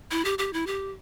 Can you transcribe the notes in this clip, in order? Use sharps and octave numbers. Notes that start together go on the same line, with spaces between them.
E4
G4
G4
E4
G4